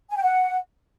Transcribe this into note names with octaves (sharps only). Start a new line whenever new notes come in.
G#5
G5
F#5